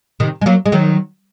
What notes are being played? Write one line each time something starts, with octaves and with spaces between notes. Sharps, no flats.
C3 D#3
G#3
F#3 A#3
G#3
D#3 F#3